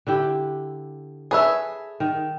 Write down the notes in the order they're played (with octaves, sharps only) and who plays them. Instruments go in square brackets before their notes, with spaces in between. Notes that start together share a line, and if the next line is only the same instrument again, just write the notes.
[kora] D3 E4 G4
[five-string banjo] G#4 B4 E5 [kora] A4 C#5
[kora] D#3